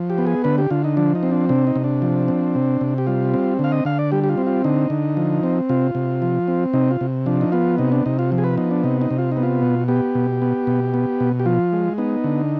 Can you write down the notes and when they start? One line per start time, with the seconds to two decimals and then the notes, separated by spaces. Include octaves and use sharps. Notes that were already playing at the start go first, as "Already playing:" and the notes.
Already playing: F3
0.10 G4
0.18 B3
0.27 G#4
0.44 D3 B4
0.58 G4
0.70 D3 F4
0.84 D#4
0.97 F3 D4
1.15 D#4
1.23 C4
1.31 D4
1.49 C3 D4
1.67 D#4
1.76 C3
1.84 D4
2.02 F3
2.28 C4
2.55 C3
2.81 C3
2.98 G4
3.07 G3 F4
3.34 C4
3.59 D3 F5
3.72 D#5
3.85 D3 F5
3.99 D5
4.12 G3 G4
4.24 G4
4.29 F4
4.38 C4
4.46 F4
4.64 D3 D#4
4.90 D3
5.17 F3
5.43 C4
5.69 C3 F4
5.95 C3
6.22 F3
6.48 C4
6.73 C3 D#4
6.91 F4
7.01 C3
7.26 F3 D4
7.41 D#4
7.52 B3 F4
7.78 C3 D#4
7.92 D4
8.06 C3 D#4
8.19 F4
8.32 F3
8.38 G#4
8.44 B4
8.57 B3 D#4
8.71 D4
8.84 C3 D#4
9.01 D#4
9.11 C3
9.18 F4
9.32 D#4
9.37 B3
9.43 F4
9.62 B2
9.88 B3 G4
10.15 B2
10.42 B3
10.67 B2
10.94 B3
11.20 B2
11.40 G4
11.46 F3 F4
11.73 G#3
11.98 B3 D#4
12.24 D3